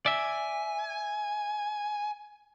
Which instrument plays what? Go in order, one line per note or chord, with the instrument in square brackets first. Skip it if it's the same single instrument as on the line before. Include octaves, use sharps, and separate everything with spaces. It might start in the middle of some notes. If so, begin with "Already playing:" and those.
[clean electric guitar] D5 E5 [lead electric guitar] G#5